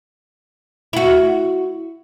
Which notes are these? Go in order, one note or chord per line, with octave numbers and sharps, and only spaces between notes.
E4 F#4